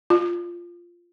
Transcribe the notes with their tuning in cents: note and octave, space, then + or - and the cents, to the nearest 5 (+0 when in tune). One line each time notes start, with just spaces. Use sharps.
F4 -5